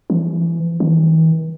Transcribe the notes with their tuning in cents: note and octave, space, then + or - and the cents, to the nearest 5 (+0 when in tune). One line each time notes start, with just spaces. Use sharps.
E3 +30
E3 -45